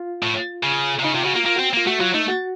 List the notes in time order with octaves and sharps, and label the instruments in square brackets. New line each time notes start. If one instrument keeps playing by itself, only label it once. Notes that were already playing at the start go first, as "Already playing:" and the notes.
Already playing: [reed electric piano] F4
[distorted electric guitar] A2
C#3
C3
[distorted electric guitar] C#3 [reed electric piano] D#4
[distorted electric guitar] C3 [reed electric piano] F4
[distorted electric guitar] C#3 [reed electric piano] F#4
[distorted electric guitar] A#3 [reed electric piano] F4
[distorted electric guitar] A#3 [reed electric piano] F4
[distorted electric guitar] C4 [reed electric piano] F#4
[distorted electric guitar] A#3 [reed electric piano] F4
[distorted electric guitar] A3 [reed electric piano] F#4
[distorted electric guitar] F#3 [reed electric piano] F4
[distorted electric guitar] A3 [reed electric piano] D#4
[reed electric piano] F#4